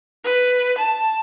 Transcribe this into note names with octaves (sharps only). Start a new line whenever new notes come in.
B4
A5